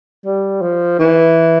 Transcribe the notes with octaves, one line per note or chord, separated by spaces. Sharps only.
G3
F3
E3